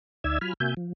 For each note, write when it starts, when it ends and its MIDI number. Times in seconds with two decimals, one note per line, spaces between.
0.24 0.38 38
0.24 0.38 63
0.24 0.38 74
0.24 0.38 76
0.24 0.38 88
0.24 0.38 92
0.41 0.53 54
0.41 0.53 65
0.41 0.53 80
0.41 0.53 83
0.41 0.53 89
0.60 0.74 48
0.60 0.74 58
0.60 0.74 66
0.60 0.74 76
0.60 0.74 80
0.60 0.74 91
0.77 0.93 53